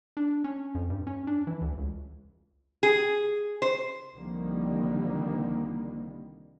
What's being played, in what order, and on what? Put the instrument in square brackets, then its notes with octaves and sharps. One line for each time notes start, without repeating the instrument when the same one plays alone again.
[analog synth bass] D4
C#4
F2
G2
C#4
D4
E3
D2
C#2
[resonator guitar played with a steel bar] G#4
C5
[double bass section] C2 D3 D#3 F3 G3 A#3